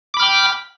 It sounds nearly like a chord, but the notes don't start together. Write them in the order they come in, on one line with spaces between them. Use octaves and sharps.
D6 B5 F6 G5